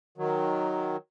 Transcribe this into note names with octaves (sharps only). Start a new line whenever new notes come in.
D#3 F#3